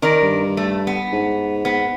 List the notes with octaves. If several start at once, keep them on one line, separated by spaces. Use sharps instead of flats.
D#3 A#4 D5
G2
A3
B3
G#2
B3